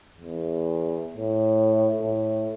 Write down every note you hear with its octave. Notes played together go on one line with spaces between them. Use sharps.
E2
A2
A2